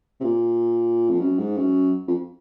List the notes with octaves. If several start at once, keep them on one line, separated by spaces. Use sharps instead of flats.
C3
A#2
F2
F#2
G#2
F#2
F2